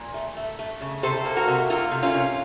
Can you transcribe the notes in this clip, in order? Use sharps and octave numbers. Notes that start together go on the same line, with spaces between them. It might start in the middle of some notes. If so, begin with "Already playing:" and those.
Already playing: A#2
A3
A3
A3
C#3
C3 A4 C5
A#3
F#4 A#4
C3
A#3 F4 A4
C3
C#4 F4
C3